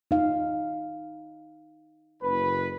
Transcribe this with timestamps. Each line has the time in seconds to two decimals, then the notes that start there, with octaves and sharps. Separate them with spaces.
0.11 D#4 F5
2.22 F#1 B4